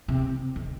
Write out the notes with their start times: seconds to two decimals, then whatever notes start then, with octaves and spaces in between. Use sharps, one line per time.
0.08 C3
0.56 D#3